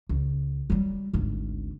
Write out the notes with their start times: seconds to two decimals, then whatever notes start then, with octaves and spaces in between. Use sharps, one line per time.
0.09 C#2
0.70 F#3 G3
1.13 G#1 D2